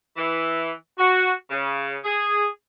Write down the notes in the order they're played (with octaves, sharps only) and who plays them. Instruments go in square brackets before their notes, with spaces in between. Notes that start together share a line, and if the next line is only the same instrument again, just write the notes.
[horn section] E3
F#4
C#3
G#4